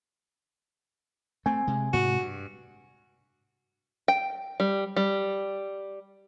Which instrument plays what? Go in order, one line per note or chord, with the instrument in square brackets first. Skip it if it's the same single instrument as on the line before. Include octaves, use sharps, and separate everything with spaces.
[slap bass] A3 C4 [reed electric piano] G#5
[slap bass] C3 G#3
[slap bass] G#2 C3 [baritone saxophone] F#4
[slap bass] G2
[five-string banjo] G5
G3
G3